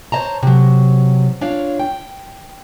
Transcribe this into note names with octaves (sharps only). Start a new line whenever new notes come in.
C5 C#5 D#5 A5 A#5
C3 F#3
D4 F4 C#5 F5
G5